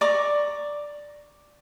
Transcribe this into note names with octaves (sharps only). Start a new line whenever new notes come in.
D5 A#5 C#6 D6